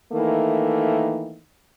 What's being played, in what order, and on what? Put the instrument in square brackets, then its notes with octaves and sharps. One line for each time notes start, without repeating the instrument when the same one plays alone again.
[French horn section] D#3 E3 A3 A#3